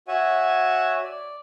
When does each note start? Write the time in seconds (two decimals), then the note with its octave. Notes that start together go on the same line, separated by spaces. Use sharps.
0.08 F#4 C#5 E5 F#5 G#5
1.04 D5